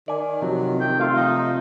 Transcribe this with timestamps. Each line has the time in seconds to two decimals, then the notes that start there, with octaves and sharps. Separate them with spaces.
0.08 D#3 D5 G#5
0.42 C3 F3 F#3
0.81 C3 G5
0.99 A3 F4 F5
1.16 F3 D#4